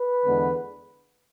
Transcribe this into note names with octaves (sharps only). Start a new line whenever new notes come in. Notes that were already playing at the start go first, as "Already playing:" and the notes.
Already playing: B4
E2 D3 G#3 B3